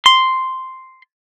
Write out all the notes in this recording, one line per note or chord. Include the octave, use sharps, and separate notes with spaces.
C6